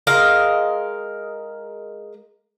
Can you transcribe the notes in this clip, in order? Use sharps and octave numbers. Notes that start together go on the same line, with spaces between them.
G#3 A#4 D#5 F5